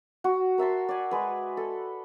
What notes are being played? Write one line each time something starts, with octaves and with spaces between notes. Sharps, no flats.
F#4
A#4 E5 A5 C6
D5 G#5
G#3 B4
A4